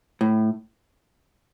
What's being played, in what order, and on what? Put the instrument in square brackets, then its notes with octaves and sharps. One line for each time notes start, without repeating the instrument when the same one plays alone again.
[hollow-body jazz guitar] A2